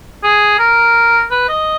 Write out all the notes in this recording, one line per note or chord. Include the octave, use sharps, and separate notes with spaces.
G#4
A#4
B4
D#5